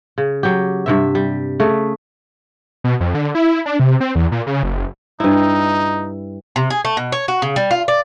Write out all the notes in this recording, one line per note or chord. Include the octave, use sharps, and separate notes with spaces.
C#3
F#3 G4
G2 C3 E5
G3
C#3 A3
B2
F2
D3
E4
D4
C3
C4
E2
A#2
C#3
F#1
G2 D#4 E4
C3
G#4
A3
B2
C#5
F#4
C#3
G3
F4
D5